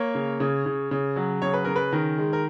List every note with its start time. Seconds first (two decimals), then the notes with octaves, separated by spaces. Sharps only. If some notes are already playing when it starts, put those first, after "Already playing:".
Already playing: A#3 C#5
0.15 C#3
0.40 C#3
0.66 C#3
0.91 C#3
1.16 F#3
1.42 C#3 C#5
1.54 B4
1.64 C#3 A#4
1.76 B4
1.93 D#3 A#4
2.18 G#3
2.33 A#4